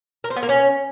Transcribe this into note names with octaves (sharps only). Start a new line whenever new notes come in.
A#4
C5
B3
A#3
C#4